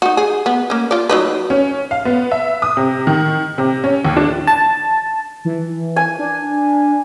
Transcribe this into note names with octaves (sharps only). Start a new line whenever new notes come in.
D#4 F#4
G#4
B3
A#3 C#4
F4 D5
F#3 D#4 B4
C#4
F5
B3
E5
D#6
C3
D#3
C3
C#4
D#2
D4
A5
E3
G#5
D4